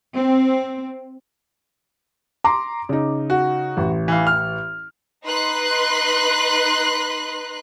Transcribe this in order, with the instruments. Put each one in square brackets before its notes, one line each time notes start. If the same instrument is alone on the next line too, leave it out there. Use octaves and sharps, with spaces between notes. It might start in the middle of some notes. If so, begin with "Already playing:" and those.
[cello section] C4
[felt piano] A#5 C6 [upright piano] D6
[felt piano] C#3 D#4
[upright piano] F#4
[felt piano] A1
[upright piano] E3 F5
F6
[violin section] D#4 B4 C6 F#6